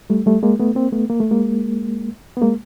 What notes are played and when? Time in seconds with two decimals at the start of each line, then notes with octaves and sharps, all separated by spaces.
0.10 G3 A3
0.26 G3 A3
0.43 G#3 A#3
0.59 A3 B3
0.75 A#3 C4
0.92 A3 B3
1.09 A#3
1.20 A3
1.31 G#3 A#3
2.37 B3
2.42 G#3 A#3